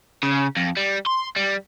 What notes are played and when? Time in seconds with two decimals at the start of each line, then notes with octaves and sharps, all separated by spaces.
0.23 C#3
0.57 F2
0.77 G3
1.06 C6
1.36 G3